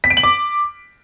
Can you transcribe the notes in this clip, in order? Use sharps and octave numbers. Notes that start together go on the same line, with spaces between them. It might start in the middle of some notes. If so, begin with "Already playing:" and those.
B6
D7
F#7
D6